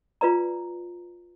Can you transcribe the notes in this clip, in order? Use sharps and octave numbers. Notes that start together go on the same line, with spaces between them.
F4 B4 D5 A#5